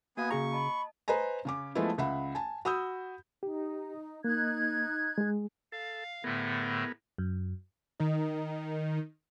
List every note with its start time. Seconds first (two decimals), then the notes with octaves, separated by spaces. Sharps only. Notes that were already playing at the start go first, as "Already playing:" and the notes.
0.17 A#3 B3 F#4 F5 G#5 D#6
0.30 C#3 G#4 A#5 C#6
0.52 D#5 A5 B5
1.08 B4 C5 D#5 G#5 A#5
1.45 C#3 C#4 D6
1.75 F3 G#3 A3 B3 E4
1.98 C#2 E5 F#5 B5
2.35 G#5 A5
2.65 F#4 B5 D#6 E6 G6
3.43 D#4 G4
4.24 A#3 D#4 F#6 G#6
5.18 G#3 G#4
5.72 A4 F5
6.24 A2 D3 A3 B3 G#4 A#4
7.18 F#2
8.00 D#3 D#4